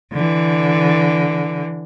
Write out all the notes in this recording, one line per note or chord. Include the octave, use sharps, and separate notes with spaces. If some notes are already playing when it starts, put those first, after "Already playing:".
D3 E3